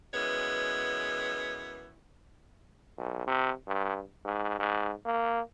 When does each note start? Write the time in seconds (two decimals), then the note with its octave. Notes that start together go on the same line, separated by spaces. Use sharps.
0.14 F#2 E3 G#3 B3 C#5
2.98 B1
3.27 C3
3.67 G2
4.25 G#2
4.59 G#2
5.05 A#3